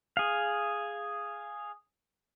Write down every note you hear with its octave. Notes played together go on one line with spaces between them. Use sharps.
G#4 F5